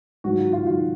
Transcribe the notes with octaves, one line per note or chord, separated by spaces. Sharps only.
G#2 D#3 F#3 F#4
F4
F4
D#3 F#3 F4